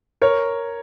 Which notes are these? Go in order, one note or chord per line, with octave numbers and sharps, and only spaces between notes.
A#4 C#5